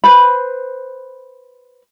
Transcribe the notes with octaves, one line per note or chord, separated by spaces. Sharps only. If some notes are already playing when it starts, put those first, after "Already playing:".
B4 C5 B5